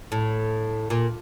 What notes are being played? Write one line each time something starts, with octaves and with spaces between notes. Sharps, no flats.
A2
A#2